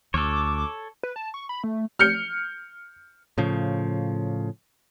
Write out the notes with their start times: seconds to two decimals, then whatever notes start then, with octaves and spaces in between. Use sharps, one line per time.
0.14 D2 A4 C#5 D6
1.03 B4
1.16 A5
1.34 C#6
1.49 B5
1.64 A3
1.99 F6 G6 C#7
3.38 A2 C#3 F3